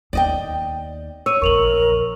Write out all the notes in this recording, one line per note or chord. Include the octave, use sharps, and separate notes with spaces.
D#2 B3 D5 D#5 G5
C#5 E6 D#7
A#1 E2 A#4 C#6 F7 F#7